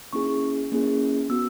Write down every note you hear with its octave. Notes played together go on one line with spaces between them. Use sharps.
A#3 C#4 E4 G#4 C#6
A#3 C#4 E4 G#4
B3 F#4 E6